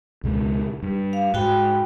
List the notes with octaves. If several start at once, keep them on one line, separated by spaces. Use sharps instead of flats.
C#2 B2 G#3
G2
F5
G#2 F#4 G5 B5